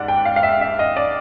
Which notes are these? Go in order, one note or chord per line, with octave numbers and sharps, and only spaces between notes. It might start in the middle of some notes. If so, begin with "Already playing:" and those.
Already playing: G#2 D5 F#5
G5
F5
F5
E5
E5
D#5
D5